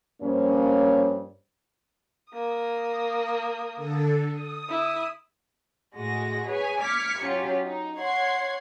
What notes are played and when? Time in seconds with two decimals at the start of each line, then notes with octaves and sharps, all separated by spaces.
0.22 G2 F3 A#3 C#4 C5 C#5
2.32 A#3 D#6
3.75 D3 A4
4.29 D#6
4.69 E4
5.96 A2 G#3 F#4 A#6
6.48 G#4 B4 C#5 G#5
6.80 D6 F6 G#6 B6 C#7
7.23 F#3 C#4 F4 G4
7.64 D#4
7.98 C#5 F#5 C6 G#6 C7